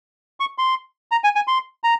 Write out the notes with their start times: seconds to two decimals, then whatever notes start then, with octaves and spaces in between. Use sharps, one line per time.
0.40 C#6
0.58 C6
1.11 A#5
1.24 G#5
1.35 G#5
1.47 C6
1.84 A#5